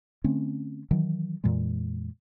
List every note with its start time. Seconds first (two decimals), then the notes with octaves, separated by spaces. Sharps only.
0.24 D3 A3 C4 C#4
0.91 D#3 E3 F#3
1.44 F2 A#2 E3 G#3